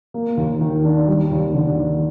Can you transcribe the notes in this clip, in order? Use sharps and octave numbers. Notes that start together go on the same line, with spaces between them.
A#3
D#2
D#3
D4
G3
D#2
D3
D#2